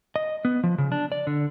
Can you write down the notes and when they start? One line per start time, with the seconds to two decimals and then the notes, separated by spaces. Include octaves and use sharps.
0.16 D#5
0.45 B3
0.64 F3
0.78 C#3
0.92 D4
1.12 D5
1.27 D3